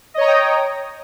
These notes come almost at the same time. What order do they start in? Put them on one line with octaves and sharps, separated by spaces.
D#5 C#5 A#5 D#6 G5